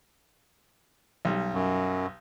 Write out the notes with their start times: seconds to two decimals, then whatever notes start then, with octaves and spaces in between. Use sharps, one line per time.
1.25 B1 G3
1.54 F#2